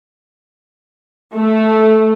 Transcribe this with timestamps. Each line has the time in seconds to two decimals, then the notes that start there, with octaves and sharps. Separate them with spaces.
1.35 A3